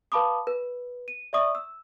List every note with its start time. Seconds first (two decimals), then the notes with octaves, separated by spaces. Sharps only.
0.12 B4 F5 A5 B5 D6 D#6
0.47 B4
1.08 D#7
1.33 D5 E5 C#6 D#6
1.55 E6